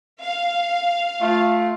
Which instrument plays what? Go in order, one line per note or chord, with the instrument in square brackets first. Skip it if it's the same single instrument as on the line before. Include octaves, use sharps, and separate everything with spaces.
[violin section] F5
[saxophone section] A3 F4